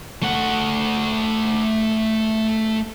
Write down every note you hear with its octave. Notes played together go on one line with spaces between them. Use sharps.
A3 F#5